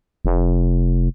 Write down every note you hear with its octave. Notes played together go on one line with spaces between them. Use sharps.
F1